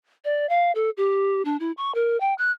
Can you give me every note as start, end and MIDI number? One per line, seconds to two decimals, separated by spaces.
0.25 0.49 74
0.49 0.72 77
0.75 0.90 69
0.97 1.42 67
1.45 1.57 62
1.60 1.72 64
1.77 1.94 85
1.95 2.19 70
2.20 2.34 79
2.38 2.51 90